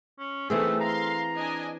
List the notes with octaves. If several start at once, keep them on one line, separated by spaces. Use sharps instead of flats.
C#4
E3 A3 B3 C4 D#4 G#4 E6
F5 A#5 C6
D4 D#5 G#5